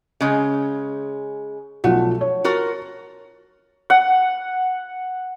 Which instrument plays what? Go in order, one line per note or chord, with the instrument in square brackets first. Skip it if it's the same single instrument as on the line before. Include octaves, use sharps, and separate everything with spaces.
[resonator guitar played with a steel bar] C#3 G#3 C#4
[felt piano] B1 F3 F#5 [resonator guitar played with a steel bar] A3
[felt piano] C#5
[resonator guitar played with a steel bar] F4 F#4 A#4
[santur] F#5